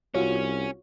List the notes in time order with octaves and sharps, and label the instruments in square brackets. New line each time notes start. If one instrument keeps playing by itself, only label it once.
[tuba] C2 [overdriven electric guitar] C#4 [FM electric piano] F4 F#4 C#5